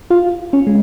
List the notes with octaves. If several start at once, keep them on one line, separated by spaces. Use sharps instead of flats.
F4
C#4
G#3